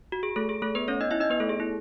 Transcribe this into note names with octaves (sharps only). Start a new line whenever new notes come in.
F#4
G#4
A3 A4
G#4
A3 A4
B3 B4
C#4 C#5
D#4 D#5
E4 E5
D#4 D#5
B3 B4
A3 A4
G#4
E4